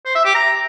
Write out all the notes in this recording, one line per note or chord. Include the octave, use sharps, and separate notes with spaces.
C5
E5
G4
A#5